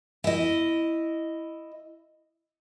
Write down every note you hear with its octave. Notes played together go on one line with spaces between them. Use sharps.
E4 D#5